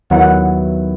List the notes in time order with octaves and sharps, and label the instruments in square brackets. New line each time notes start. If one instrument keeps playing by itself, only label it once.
[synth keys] D#2 D#3 F#3 B3 E4 [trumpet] F#5